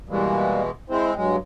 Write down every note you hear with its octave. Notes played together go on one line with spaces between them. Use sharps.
B2 E3 G3 G#3 A#3
G#3 C4 E4 C5
G2 F#3 G#3